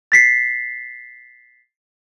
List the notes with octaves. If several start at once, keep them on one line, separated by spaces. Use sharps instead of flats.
A6 B6 C7